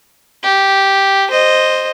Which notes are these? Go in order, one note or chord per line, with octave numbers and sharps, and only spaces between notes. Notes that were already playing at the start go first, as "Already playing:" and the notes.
G4
C5 D#5